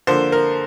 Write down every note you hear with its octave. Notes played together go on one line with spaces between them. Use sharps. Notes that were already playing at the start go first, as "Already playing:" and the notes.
D3 F3 A#3 C5
A#4